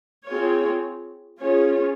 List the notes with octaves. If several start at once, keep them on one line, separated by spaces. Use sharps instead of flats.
C4 F4 G#4 C#5
C#4 F4 G#4 C#5